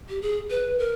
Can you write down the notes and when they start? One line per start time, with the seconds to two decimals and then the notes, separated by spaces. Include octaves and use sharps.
0.09 G4
0.22 G#4
0.50 B4
0.79 A#4